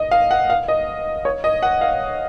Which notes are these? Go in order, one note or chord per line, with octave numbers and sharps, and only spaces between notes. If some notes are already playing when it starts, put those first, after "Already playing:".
Already playing: D#5
F5
F#5
F5
D#5
C#5
D#5
F#5
F5